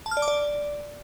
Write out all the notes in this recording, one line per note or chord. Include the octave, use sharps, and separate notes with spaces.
A5
F6
D5
D6
D5